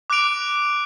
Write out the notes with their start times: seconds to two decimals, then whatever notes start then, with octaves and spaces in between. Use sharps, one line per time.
0.10 D6 F#6 D7 F7